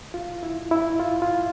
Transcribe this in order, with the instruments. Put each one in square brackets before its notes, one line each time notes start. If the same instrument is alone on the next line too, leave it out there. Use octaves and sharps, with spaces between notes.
[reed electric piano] F4
E4
E4
F4
F4